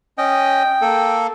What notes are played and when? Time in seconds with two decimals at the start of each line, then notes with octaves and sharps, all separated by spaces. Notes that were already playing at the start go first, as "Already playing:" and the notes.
0.18 C#4 D#5 G5
0.81 A#3 A4